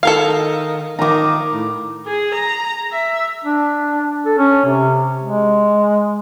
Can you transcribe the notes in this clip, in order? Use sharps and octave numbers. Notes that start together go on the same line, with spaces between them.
D#3 A4 A#4 F5
D#3 A#5 D6
A2
G#4
A#5
E5
D4
A4
C#4
C3
G#3